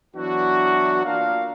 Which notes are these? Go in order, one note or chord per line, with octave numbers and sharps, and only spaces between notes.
E3 F#3 B3 D4 E4 F#4
A#3 D4 F4 A#4 F5